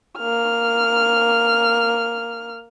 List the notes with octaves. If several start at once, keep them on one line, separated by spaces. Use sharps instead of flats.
A#3 F6